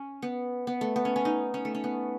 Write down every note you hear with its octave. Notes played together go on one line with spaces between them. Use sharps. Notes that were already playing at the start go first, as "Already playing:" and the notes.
Already playing: C#4
B3
B3
A3
B3
C#4
C#4
D#4
C#4
A3
C#4
B3